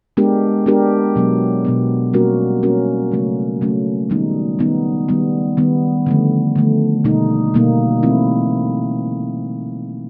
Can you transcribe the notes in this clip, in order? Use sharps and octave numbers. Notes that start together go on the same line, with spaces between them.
G#3 B3 D4 G4 A#4
G#3 B3 D4 G4 A#4
B2 F#3 B3
B2 F#3 B3
G3 A#3 C#4 F#4 A#4
G3 A#3 C#4 F#4 A#4
C#3 F#3 A3 C#4
C#3 F#3 A3 C#4
D#3 G3 B3 D#4
D#3 G3 B3 D#4
D#3 G3 B3
D#3 G3 B3
D3 F3 A3
D3 F3 A3
B2 G3 A#3 D#4
B2 G3 A#3 D#4
E3 A3 C4 E4